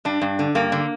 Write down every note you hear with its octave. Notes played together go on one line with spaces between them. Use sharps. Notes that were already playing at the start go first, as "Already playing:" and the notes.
G2 D4
G2
D3
G2 A#3
D3